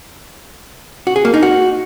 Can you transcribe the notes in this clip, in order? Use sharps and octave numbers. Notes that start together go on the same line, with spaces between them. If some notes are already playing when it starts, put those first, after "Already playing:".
F#4
G#4
A#3
D#4
F#4